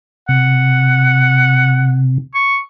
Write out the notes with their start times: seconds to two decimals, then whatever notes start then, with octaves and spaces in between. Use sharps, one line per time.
0.29 C3 F#5
2.34 C#6